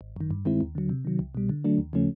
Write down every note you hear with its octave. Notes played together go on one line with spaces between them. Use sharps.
G#1
F#2 D#3
G2
D#3 G#3 C4 E4
D#2
D3 F#3
C3
D#3 F#3
C2
B2 G3
D3
F#3 A3 D4
D#2
C#3 F3 A3 C#4